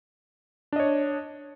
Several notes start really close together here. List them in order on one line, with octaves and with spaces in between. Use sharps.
D4 D#5 C#5